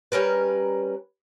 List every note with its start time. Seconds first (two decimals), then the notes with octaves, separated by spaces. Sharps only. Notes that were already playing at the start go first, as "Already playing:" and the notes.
0.12 G3 C#4 A#4 B4